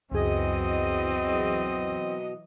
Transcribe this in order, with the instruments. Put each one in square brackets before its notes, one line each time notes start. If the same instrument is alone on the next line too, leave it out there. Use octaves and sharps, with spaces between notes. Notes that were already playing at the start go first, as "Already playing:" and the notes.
[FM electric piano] C#2 F#2 G#4 [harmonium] B2 [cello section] E3 F#3 D#5 [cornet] C4